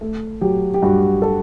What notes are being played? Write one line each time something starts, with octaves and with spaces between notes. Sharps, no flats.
A3
F#3 G4
G4
G2 F#4
A4